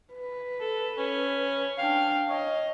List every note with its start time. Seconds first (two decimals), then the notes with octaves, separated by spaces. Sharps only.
0.14 B4
0.61 A4
0.98 C#4
1.78 D4 F5 G5
2.29 C#5 D#5